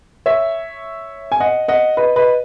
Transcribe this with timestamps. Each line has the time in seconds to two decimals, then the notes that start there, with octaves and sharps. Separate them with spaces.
0.26 C#5 E5
1.32 G#5
1.40 D#5 F#5
1.68 D#5 F#5
1.97 B4 D#5
2.16 B4 D#5